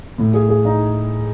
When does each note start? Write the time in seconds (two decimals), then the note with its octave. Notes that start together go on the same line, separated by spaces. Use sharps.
0.18 A2
0.34 G#4
0.49 G#4
0.65 D#4